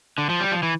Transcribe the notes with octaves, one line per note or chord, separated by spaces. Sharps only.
D3
F3
G3
F3
E3